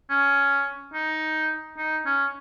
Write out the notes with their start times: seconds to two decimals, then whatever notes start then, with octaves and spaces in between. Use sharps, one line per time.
0.10 C#4
0.94 D#4
1.77 D#4
2.06 C#4